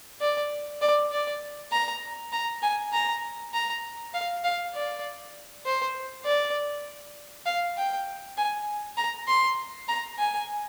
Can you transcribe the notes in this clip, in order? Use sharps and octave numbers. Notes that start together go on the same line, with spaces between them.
D5
D5
D5
A#5
A#5
G#5
A#5
A#5
F5
F5
D5
C5
D5
F5
G5
G#5
A#5
C6
A#5
G#5